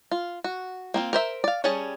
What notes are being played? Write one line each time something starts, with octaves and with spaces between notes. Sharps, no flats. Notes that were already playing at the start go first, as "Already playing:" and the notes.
F4
F#4
A#3 C4 F4
A#4 C5 E5
D5 F5
G3 C#4 G#4 C#5 A5